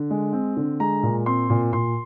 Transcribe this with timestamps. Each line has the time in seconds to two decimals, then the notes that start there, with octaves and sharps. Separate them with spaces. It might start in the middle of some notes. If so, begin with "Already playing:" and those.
Already playing: D3
0.10 G#3
0.33 C4
0.57 D3
0.80 G#3 A#5
1.03 A#2
1.26 C4 C6
1.50 A#2
1.73 A#2 C6